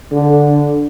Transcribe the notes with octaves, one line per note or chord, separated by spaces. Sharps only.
D3